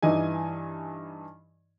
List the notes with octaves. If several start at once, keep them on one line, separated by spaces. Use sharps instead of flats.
G2 E3 D#4 D#5 G#5